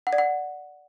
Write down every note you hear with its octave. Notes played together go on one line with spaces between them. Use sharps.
F#5
D5
F#5